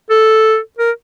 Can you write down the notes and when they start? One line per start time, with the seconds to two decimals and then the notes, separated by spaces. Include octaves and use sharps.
0.10 A4
0.79 A#4